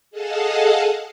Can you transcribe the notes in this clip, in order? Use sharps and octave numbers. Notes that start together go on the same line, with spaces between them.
G#4 A4 D#5 F5 F#5 A5